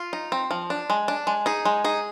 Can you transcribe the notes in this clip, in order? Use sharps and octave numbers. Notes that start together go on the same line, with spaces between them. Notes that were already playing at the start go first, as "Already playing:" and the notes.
Already playing: F4
D#4
C4
F3
D4
G#3
D4
G#3
D#4 G#4
G#3
D#4 G#4